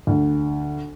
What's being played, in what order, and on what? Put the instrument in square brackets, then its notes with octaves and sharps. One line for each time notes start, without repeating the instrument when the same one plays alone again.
[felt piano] D2